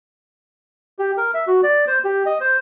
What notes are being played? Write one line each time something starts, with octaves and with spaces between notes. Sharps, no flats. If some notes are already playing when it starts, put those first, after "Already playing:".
G4
A#4
E5
F#4
D5
C5
G4
D#5
C5